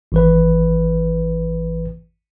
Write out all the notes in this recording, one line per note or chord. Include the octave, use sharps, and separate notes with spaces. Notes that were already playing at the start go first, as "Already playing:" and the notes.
G#1 E3 B4